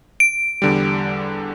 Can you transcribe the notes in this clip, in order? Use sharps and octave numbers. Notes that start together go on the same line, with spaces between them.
D7
E2 D3 G3